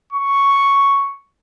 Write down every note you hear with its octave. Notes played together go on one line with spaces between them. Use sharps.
C#6